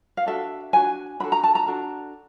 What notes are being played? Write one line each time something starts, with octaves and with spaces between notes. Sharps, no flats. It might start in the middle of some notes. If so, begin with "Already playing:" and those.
F5
D4 F#4 A4 E5
D4 F#4 G#5
D4 F#4 A4 B5
A#5
A5
A#5
D4 F#4 A4